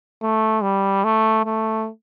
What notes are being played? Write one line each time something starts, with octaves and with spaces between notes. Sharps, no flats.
A3
G3
A3
A3